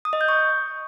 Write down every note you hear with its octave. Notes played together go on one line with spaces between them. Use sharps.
D#6
D#5
G6
C#6